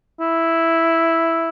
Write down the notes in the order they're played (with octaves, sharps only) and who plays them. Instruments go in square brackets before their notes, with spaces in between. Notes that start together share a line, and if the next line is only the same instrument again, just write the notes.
[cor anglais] E4